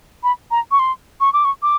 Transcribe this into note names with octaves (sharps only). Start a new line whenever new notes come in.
B5
A#5
C#6
C6
C#6
D6
C#6
D6